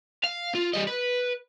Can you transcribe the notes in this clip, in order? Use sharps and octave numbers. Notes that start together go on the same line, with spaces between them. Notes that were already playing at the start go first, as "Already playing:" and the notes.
F5
F4
G3 D#5
B4